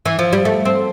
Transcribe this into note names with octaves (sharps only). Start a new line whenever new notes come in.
E3
F3
G3
A3
C4